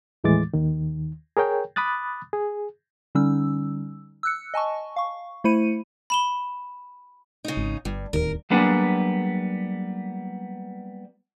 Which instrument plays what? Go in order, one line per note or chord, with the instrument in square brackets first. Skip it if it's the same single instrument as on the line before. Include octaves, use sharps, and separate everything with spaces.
[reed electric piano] D#2 A2 E3 G#3 D6 A6
D#2 D#3
G#4 A#4 C#5 G5
B5 D6 D#6 F#6 A6
G#4
[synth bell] D3 G3 C#4 D#4 E6
E6 F#6 C#7
D#5 G#5 A5 C#6
F5 C#6
A3 E4 C5 B5 C#7 D#7
[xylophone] B5 E7 G7
[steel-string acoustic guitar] C#3 D#4
[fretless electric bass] G#1
[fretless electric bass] G1 [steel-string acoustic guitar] G2
[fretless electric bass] D1 G1 D#2 [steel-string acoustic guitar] A#4
[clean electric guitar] F#3 G3 A#3 B3 D4 G#4